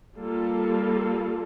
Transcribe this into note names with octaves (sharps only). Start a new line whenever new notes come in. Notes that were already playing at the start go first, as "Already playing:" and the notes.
G3 A#3 F4 A4